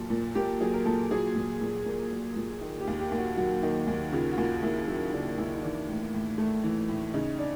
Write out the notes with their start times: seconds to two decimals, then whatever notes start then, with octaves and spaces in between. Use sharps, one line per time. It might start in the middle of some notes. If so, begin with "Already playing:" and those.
Already playing: A#2 F#3 A4
0.10 A#2
0.35 A#3 G4
0.61 F#3 G#4
0.74 A#4
0.86 A#2 A4
1.11 F#3 G#4
1.36 A#2
1.61 A#2
1.86 A#3
2.12 F#3
2.36 A#2
2.61 D#3
2.80 G4
2.87 D#2
2.99 G4
3.11 D#2
3.18 F#4
3.37 F#3 F#4
3.63 D#3
3.87 D#2
4.12 C#3 F4
4.32 F#4
4.38 D#2 F4
4.62 D#2 E4
4.87 F#3 E4
5.13 C#3 D4
5.38 D#2 E4
5.54 D#4
5.63 E3 D4
5.89 A2
6.13 A2
6.38 A3
6.64 E3
6.88 A2
7.14 C#3 D#4
7.39 D4